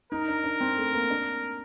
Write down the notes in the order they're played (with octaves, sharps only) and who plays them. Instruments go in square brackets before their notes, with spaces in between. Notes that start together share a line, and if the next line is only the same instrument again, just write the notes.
[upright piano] D#4 [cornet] A#4
[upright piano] D4
D4
C4
A3
A#3
D4